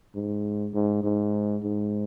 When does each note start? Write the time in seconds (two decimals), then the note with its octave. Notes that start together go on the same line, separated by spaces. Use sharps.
0.15 G#2
0.74 G#2
1.03 G#2
1.63 G#2